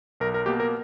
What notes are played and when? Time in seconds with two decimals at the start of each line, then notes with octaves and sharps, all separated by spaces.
0.20 B1 A#4
0.34 A#4
0.46 B2 A#3 G4
0.60 A#4